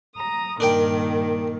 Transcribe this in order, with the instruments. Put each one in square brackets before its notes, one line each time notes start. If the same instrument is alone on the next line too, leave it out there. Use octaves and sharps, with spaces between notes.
[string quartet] A#5 D#6
[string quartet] G2 A#2 D#3 [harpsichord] D4 A#4 G5